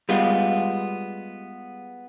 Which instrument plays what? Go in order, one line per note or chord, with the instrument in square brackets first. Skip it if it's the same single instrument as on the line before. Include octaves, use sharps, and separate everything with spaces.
[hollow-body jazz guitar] G3 G#3 B3 F4